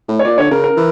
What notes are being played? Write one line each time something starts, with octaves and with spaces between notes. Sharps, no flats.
A2
C#5
A#2 D5
D3 C#5
C#3 A#4
A#4
E3